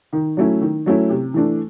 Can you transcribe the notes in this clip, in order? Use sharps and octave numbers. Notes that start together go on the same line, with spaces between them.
D#3
F#3 A3 C#4 E4
D#3
F#3 A3 C#4 E4
C3
E3 A3 D4